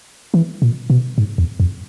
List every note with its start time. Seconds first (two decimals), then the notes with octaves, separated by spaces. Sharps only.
0.34 E3
0.62 A#2
0.90 B2
1.18 G#2
1.38 E2
1.60 F2